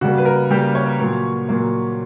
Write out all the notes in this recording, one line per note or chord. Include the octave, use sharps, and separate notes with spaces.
C#3 G3 A#3 F#4
B4
A#4
C#3 G3 A#3 G4
C#5
A#2 F#3 A#3
A#2 F#3 A#3